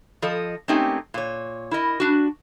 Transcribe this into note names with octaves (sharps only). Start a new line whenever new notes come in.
F3 A4 D#5
A3 A#3 C4 C#4 D#4 G4
A#2 C#5
E4 A#4 D#5
D4 F#4